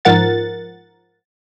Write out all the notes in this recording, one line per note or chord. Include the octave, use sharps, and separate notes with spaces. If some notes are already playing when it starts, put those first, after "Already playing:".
G#2 F3 A#4 F#5 A6